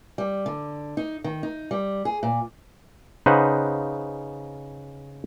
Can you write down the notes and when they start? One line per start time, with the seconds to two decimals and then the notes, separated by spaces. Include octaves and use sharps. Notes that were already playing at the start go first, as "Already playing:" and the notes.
0.18 G3
0.46 D3
0.97 D#4
1.24 D#3
1.43 D#4
1.71 G3
2.05 G#4
2.23 A#2
3.26 C#3 D#4 B4 C5 F#5